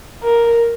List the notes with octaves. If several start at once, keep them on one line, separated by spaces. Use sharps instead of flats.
A#4